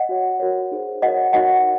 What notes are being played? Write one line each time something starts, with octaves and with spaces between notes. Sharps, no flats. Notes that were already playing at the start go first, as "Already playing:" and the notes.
Already playing: D#5 F#5
F#4 C#5
F#4 A#4 C#5
D#4 G#4 C5
F#4 A#4 C#5 D#5 F#5
D#4 F#4 A#4 C#5 D#5 F#5